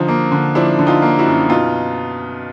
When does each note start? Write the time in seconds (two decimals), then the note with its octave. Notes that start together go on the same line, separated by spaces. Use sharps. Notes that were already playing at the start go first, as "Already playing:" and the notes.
Already playing: D3 F3 D#4
0.08 A#3
0.32 D3
0.55 F3 D4 E4
0.79 D3
0.87 D#4 F4
1.02 A#3
1.19 E4 F#4
1.27 F#2
1.49 B2 D#4 F4